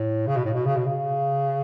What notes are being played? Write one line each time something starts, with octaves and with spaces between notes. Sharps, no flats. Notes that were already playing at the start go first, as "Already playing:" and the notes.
Already playing: A2
C#3
B2
A2
B2
C#3
B2
C#3